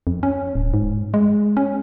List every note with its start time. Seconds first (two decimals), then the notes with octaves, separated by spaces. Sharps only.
0.07 F2
0.23 C#4
0.55 D1
0.74 G#2
1.14 G#3
1.57 C#4